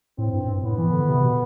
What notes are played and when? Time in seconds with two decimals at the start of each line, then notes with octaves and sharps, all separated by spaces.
0.18 A2 C4
0.33 G2
0.48 G2
0.63 A2 B3
0.78 E3
0.93 D3
1.08 C3
1.23 B2